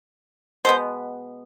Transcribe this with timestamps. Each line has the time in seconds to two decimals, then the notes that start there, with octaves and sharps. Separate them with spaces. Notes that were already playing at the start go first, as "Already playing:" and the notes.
0.65 B2 G#3 B3 C5